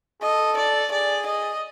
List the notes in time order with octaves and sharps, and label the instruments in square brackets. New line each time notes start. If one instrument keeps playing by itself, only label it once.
[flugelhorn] A4 [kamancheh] D#5
[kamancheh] D5
[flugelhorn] G#4 [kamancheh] D5
[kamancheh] D#5